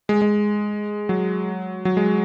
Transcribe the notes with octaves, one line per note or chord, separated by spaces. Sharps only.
G#3
G#3
F#3
F#3
G#3